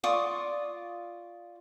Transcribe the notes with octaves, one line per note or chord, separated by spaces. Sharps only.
F4 D5 C#6 D#6